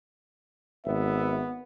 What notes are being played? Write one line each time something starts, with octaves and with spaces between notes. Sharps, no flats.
G#1 B3 E5